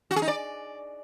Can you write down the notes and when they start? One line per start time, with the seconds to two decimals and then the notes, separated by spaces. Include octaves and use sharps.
0.11 F#4
0.16 G#4
0.22 D#4
0.28 D5